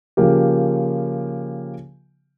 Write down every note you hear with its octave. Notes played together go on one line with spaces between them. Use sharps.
C#3 F3 A#3 G4